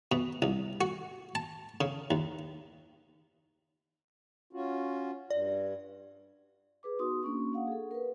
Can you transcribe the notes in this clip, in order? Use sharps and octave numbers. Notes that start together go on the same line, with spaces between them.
B2
C2
F#4
A5
C#3
D#2
C#4 F4 F#4
G2 D5
G#4 B4 D6
B3 D#4 F#4 C6 D#6
A#3 C#4 D4 C#6
A#3 D4 F5 F#5
G#4 A4
A#4 B4